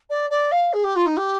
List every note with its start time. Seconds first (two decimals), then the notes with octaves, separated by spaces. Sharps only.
0.10 D5
0.30 D5
0.51 F5
0.73 G#4
0.84 G4
0.96 F4
1.06 D#4
1.17 G4